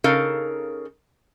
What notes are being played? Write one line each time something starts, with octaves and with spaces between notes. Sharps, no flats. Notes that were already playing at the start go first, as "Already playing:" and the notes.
C#3 D#4 A4 A#4 F5